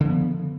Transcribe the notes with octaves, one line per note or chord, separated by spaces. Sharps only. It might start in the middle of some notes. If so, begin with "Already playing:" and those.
D3 F3 B3